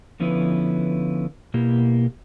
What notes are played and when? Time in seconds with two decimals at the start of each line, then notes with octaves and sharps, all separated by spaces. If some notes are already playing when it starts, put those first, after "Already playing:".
0.20 D3 F3 B3 C#4 E4 B4
1.54 B2 A#3 E4 G4